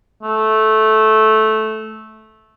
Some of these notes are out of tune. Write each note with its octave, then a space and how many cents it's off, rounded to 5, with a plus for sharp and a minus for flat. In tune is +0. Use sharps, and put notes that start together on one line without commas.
A3 -10